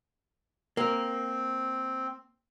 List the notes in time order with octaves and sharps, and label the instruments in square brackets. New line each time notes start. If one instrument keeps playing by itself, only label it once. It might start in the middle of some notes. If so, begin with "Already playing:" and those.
[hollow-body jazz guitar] A#3 [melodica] C4